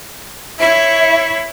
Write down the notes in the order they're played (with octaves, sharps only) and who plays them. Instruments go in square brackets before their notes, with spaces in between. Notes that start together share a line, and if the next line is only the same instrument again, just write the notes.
[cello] E4 C#5 [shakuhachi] E5